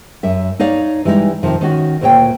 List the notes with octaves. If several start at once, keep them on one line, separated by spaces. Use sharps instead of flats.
F#2 E5
D#4 C#5 D5 F5
E3 G3 G#3 D#4
F2 C3 D#3 F3
D#3 C#4 F#4
D2 A#2 C#5 G5